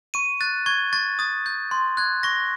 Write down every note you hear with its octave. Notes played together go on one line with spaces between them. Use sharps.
C#6 D#7
F#6 A6
C#6 G#6
C#6 A6
D#6 A6
G6
C6
F#6 G#6
C#6 A#6